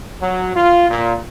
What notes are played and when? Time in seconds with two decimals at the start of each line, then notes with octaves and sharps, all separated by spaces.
0.21 F#3
0.55 F4
0.90 A#2